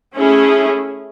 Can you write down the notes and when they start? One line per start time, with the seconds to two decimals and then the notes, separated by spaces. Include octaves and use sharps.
0.15 A3 C#4 E4 G#4